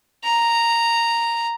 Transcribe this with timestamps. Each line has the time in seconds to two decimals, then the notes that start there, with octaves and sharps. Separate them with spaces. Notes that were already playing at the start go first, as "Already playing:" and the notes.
0.24 A#5